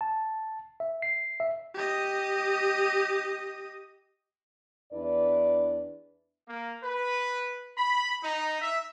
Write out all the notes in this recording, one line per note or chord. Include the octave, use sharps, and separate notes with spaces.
A5
E5
C7
E5
G4 D#5
E2 D4 E4 B4 D5
A#3
B4
B5
D#4
E5